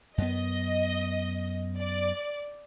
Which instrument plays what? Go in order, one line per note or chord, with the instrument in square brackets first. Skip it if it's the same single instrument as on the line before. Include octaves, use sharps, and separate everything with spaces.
[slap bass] F#2 B3 [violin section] D#5
[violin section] D5